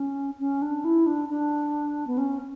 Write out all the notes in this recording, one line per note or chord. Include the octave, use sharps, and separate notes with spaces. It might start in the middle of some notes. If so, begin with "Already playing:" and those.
Already playing: C#4
C#4
D4
E4
D4
D4
B3
C#4